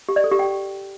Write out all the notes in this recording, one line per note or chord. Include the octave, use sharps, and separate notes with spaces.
G4
D5
A4
G4
G5